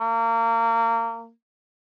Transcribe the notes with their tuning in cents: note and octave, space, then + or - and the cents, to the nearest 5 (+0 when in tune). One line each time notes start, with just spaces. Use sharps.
A#3 -25